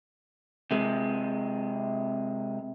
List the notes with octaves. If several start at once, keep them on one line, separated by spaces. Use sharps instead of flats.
C3 G#3